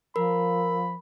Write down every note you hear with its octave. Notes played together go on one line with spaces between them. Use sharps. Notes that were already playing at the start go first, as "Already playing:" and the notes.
F3 A#4 B5